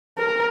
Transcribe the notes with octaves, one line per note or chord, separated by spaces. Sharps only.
A#4